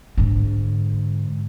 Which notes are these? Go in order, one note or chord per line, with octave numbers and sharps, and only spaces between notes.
G#2 D3